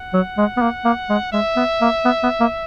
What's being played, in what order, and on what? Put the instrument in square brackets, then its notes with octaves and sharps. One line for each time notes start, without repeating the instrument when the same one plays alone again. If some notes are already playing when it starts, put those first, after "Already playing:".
Already playing: [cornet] F#5
[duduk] F#3
G#3
B3
A#3
A#3
G#3
[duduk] G#3 [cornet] E5
[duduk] B3
A#3
B3
B3
A#3